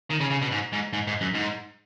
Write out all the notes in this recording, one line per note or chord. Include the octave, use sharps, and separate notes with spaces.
D#3
C#3
C#3
B2
G#2
G#2
G#2
G#2
F#2
G#2